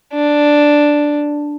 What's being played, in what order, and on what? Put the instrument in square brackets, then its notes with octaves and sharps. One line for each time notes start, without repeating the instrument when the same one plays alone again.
[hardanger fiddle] D4